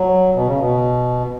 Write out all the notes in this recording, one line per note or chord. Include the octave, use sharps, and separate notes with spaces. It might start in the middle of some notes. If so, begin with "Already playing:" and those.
Already playing: F#3
B2
C#3
B2